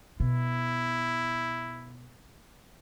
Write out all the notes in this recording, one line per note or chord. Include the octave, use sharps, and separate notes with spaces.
B2 E4